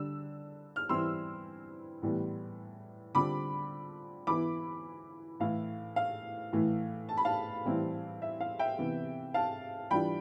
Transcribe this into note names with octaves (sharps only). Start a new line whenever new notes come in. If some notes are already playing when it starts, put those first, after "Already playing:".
Already playing: D3 G3 D4 E6
F6
E3 G3 C4 E4 C6 E6
A2 E3 G3 B3
D3 G3 C4 F4 B5 D6
E3 B3 E4 B5 D6
A2 E3 A3 E4 F5
F5
A2 E3 A3
A5
B5
F5 A5
A2 E3 G3 C4 E4
E5
F5
E5 G5
C3 E3 B3
F5 A5
E3 G3 D4 F4 G5 B5